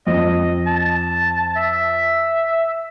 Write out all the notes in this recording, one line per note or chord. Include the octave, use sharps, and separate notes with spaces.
F2 D#5
A5
E5